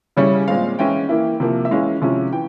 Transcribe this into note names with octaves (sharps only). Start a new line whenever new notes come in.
C#3 G3 C#4 E4 C#5
A#2 G#3 C4 F5
E3 G#3 C#4 E4 G5
E3 A#3 E4
C3 F3 A#3 E4
E5
E3 G#3 C#4 E4 F5
C3 F3 G#3 C#4 E4
E3 G5